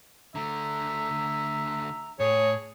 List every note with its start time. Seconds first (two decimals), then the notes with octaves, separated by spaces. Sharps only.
0.35 D3 A3 E5 A#5
2.20 A2 G#4 C#5